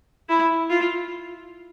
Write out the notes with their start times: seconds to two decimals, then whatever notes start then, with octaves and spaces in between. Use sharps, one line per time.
0.29 E4
0.70 F4